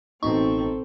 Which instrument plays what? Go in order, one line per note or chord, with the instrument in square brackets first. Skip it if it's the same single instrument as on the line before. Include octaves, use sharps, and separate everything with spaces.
[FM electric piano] A1 B2 D#4 [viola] C4 A4 [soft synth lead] C#6